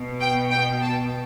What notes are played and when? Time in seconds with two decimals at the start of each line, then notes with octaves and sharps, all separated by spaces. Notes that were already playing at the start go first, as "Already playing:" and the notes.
Already playing: B2
0.20 G5
0.51 G5
0.82 A5